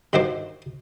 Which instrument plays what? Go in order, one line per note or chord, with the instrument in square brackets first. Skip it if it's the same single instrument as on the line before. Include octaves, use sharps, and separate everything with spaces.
[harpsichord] G2 D#3 E4 F#4 C5 D6